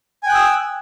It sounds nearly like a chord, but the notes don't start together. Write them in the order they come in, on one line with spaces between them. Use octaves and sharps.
G#5 G5 F#6 D#6 E6